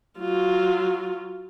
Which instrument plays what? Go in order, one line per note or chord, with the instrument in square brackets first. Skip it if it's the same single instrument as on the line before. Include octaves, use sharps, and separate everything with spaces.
[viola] F#3 F4